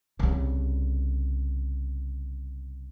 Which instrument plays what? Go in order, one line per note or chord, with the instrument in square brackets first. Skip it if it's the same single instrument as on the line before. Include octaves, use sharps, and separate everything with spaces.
[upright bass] C2 C#3